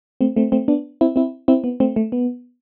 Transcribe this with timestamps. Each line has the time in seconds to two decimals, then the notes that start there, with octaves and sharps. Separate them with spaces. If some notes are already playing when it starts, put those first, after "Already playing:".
0.21 A3 C4
0.36 A3 C4
0.52 A3 C4
0.68 B3 D4
1.01 C4 E4
1.16 C4 E4
1.48 C4 E4
1.64 B3
1.80 A3 C4
1.96 A3
2.12 B3